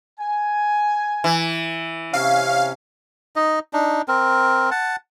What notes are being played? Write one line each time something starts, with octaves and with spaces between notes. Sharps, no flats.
G#5
E3
C3 C#4 F5
D#4 D#5
D4 D#4
C4 A#4
F#5 A5